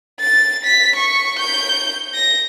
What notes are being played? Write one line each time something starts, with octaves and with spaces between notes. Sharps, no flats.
A6
B6
C#6
G6
A#6